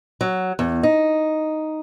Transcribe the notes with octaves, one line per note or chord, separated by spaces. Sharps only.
F#3
E2
D#4